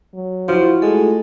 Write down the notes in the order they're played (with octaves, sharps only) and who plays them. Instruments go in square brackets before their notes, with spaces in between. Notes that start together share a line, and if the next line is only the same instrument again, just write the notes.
[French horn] F#3
[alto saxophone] F3 [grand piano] E4 F#4 [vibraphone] C6
[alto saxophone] G#3 [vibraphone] A3 F4 A4 [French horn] G#4